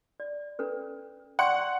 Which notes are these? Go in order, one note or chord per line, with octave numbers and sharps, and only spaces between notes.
D5
C#4 A4 B4
D5 F#5 C6 C#6